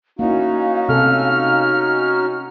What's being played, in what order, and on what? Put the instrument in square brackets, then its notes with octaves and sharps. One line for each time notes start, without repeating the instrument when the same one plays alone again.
[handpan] A#3 E4 [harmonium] C#4 D#4 F#4 [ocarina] F5
[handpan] C3 A4 [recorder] F6